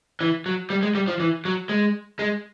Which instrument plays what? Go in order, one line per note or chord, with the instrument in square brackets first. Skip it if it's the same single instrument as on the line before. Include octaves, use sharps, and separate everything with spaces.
[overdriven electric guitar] E3
F#3
G3
G#3
G3
F3
E3
F#3
G#3
G#3